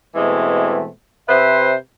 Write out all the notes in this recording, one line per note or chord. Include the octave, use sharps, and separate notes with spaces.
B2 E3 G#3 A3 C4
C3 B4 C5 E5